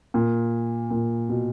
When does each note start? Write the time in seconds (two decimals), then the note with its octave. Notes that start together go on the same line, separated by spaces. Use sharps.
0.14 A#2
0.91 A#2
1.29 B2